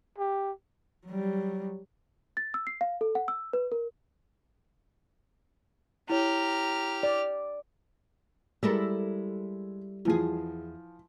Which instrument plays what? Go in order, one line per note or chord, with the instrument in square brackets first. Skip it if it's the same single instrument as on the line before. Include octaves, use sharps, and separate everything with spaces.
[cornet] G4
[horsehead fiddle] F#3 G3
[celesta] A6
E6
C7
F5
A4
F#5
E6
B4
A#4
[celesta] E4 C#5 [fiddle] G4 F6 [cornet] A#5
[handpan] D5
[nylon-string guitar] G3 [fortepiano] G#3 [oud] E4 A4 A#4
[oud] E2 G#4 [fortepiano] E3 F3